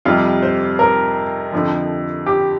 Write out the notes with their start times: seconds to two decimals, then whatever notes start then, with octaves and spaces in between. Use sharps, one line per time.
0.05 F2 C3 G3 F4
0.42 C5
0.79 A#4
1.52 F2 D3 F3
2.26 G4